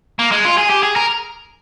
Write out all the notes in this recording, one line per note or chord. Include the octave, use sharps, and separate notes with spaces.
A#3
G#3
F4
G#4
G4
G#4
A#4